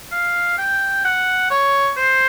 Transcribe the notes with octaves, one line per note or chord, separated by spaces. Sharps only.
F5
G5
F#5
C#5
C5